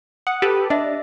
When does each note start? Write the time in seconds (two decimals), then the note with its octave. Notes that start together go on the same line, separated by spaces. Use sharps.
0.27 F#5 D#6
0.42 G4 A4 B4
0.70 D4 D#5 E5